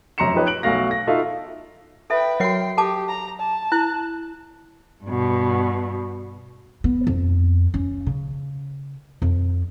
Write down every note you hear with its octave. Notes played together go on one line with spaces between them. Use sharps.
F1 F#2 A#5 C6 C#7 E7
F3 D#4 G4 B4 C#5 D#5
F#6 D7 F#7
B1 A3 F#4 F5 A#6
A#6
D#4 F4 F#4 A4 E5 F5
A4 B4 E5 G5
F#3 F#4 A#4 D#5 G5 C7
G4 A4 A5 D6
A#5
A5
E4 F#6
G2 B2
B3
F2
C#4
C#3
F2